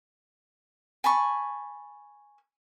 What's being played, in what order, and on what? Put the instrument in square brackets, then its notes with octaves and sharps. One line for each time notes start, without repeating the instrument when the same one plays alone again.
[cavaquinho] G#5 A5 B5 C#6